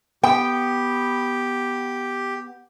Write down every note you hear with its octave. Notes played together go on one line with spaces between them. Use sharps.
B3 G4 G5